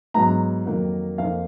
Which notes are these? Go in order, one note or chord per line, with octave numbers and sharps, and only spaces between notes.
G#2 F#3 B3 A#5
F2 D#3 F#3 A#3
F2 F3 A#3 D#4 F5